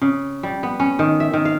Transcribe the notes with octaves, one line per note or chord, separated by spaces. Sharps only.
C#3
G3
B3
C#4
D#3
E5
D#3
F5